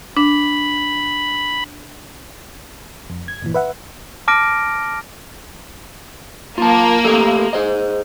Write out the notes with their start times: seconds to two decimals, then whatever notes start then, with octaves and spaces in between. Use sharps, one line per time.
0.17 D4 B5
3.10 F2
3.28 G#6
3.42 G1 A#2 E3
3.54 B4 E5 F#5
4.28 A5 D6 F6 A#6 D7
6.58 A#3 F4 A5
7.05 A3 G4 A4
7.53 G#4 C5 D#5